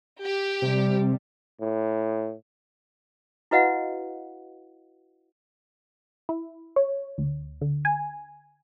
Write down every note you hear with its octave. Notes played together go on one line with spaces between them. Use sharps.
G4
C3 G3
A2
E4 F#4 B4 D#5 F5 F#5
E4
C#5
D2
D3
G#5